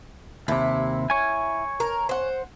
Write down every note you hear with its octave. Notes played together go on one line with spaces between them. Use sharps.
D#2 C3 E4
C#5 G#5
A#4
C5 F#5